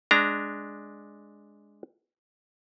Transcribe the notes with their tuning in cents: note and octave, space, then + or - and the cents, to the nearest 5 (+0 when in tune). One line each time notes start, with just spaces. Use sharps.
G#3 +0 D4 +0 A#5 -5